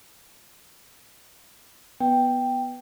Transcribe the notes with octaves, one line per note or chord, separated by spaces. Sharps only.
B3 G5